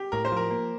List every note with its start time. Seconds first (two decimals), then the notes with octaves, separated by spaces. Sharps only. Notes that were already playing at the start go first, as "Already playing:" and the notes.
Already playing: G4
0.12 A2 A#4
0.25 C5
0.32 F3 A#4
0.51 A#3